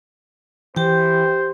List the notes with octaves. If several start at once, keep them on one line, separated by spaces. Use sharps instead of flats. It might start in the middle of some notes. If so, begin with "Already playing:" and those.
E3 G4 C5 G5